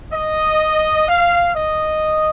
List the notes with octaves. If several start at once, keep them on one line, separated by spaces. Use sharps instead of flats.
D#5
F5
D#5